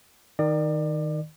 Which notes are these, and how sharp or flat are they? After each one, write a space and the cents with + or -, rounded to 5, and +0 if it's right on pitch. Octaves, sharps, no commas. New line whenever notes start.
D#3 +0 D5 +30